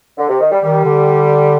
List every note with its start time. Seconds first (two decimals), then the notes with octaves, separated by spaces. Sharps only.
0.17 D3
0.28 C3
0.40 D#3
0.51 G3
0.62 D#3 G3
0.84 D3